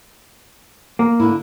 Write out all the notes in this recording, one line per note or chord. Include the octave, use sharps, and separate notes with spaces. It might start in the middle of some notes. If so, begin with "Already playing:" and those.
A#3
D3 E4